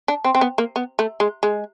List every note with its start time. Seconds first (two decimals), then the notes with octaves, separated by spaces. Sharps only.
0.08 D4
0.24 C4
0.35 C4
0.41 B3
0.58 A#3
0.76 B3
0.99 A3
1.20 G#3
1.43 G#3